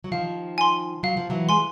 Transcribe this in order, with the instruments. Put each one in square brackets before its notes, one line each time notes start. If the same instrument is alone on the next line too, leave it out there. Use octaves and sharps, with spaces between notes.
[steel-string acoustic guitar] F#3
[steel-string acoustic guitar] D#3 F3 [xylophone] F5
[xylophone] G#5 C6
[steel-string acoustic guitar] F#3 [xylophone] F5
[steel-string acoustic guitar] F3
E3 F#3
[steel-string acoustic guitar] G#3 [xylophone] G#5 C6